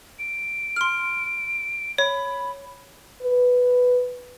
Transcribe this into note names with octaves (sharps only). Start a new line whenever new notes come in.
D7
C6 F6
C#5 B5
B4